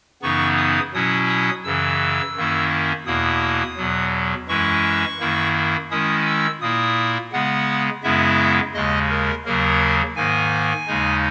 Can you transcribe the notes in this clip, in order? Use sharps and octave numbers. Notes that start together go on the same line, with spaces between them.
F#2 C#3 E3 B3 D#4 C#6
D#6
B2 F#3 C#4 E4 D#6
D#6
F#2 C#3 E3 E6
F#2 D#3 A#3 C#4 E4
E2 B2 A#3 E4 D#6
E2 B2 F#3
F#2 E3 G#3 C#4 E4 C#6
F#2 D#3 A#3 E4
D#3 G#3 C#4 E4 D#6
E6
A#2 A#3 E4 D#6
C#3 G#3 B3 F#5
F#2 C#3 G#3 B3 E4 E5
D#2 C#3 G#3 D#5
A#4
D#2 C#3 F#3 A#3 A#4
G#2 D#3 A#3 G#5
D#2 C#3 G#3 D#4